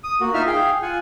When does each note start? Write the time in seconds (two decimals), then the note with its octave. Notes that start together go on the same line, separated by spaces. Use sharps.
0.04 D#6
0.21 A#3 F#4
0.34 D#4 F4 E5 F6
0.47 G#4 F5 G5
0.82 F4 F#5 G#5